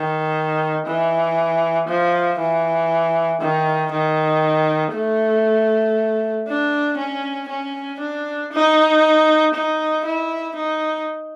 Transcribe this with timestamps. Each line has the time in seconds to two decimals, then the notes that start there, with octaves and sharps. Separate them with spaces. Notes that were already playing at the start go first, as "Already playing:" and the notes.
Already playing: D#3
0.86 E3
1.88 F3
2.39 E3
3.41 D#3
3.91 D#3
4.94 A3
6.47 D4
6.98 C#4
7.49 C#4
8.00 D4
8.52 D#4
9.54 D#4
10.05 E4
10.56 D#4